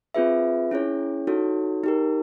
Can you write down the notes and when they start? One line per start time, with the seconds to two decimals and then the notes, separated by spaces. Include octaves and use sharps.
0.14 C4 F4 G#4 B4 E5
0.71 C#4 E4 G#4 C#5
1.27 D#4 F#4 A4 C#5
1.84 D#4 G4 A#4